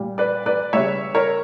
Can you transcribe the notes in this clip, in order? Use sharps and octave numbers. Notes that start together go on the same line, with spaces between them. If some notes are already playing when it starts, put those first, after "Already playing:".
Already playing: A#2 G3
B4 D5
B4 D5
C#3 G3 C#5 E5
A#4 C#5